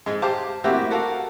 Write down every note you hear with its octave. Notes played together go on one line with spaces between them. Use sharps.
G#2 G#3
G4 C5 F5 A5 C6 D6
A3 A#3 C4 E4 F#4 G4
F#4 A4 A#4 F5